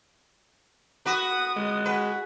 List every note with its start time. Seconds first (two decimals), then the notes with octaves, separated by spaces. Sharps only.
1.06 F#4 B4 D#6
1.56 G#3
1.85 F#4 G#4 B4